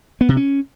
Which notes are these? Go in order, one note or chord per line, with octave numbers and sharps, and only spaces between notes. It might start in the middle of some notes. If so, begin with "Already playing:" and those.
B3
C3
C#4